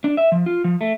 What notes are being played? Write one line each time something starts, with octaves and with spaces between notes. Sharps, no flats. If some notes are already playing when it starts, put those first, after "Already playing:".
D4
E5
F3
F4
F3
A3